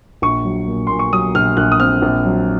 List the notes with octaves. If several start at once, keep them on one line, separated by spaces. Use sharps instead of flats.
A#1 C#6
F#3
A#2
A#2 C6
C#6
F#3 D#6
A#1 F6
A#1 F#6
D#6
C4 F6
A#1
F#3